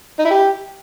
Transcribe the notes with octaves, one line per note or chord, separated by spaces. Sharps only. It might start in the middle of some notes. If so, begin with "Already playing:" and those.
D#4
E4
G4